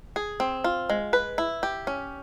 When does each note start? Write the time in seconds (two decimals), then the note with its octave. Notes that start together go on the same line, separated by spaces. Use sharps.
0.16 G#4
0.40 C4
0.64 F4
0.90 G#3
1.13 B4
1.38 E4
1.63 G4
1.87 C#4